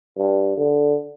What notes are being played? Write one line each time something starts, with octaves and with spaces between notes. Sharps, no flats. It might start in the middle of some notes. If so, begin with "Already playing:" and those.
G2
D3